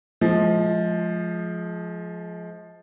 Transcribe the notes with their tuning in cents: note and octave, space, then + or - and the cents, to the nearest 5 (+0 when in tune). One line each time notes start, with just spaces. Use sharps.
F3 +0 G#3 +30